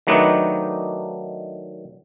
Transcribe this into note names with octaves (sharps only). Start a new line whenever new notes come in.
D#3 F#3 A3 D4 D#4 B4